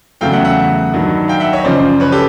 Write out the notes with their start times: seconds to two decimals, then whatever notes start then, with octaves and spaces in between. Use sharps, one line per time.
0.21 E2 C#3 F#3 A3 F5 G5
0.33 E5 F#5
0.45 E5 F#5
0.93 G2 D#3 F#3
1.28 F5 G5
1.40 E5 F#5
1.53 C#5 D#5
1.64 F#2 C#3 F3 C5 D5
2.00 B4 C#5
2.12 G4 A4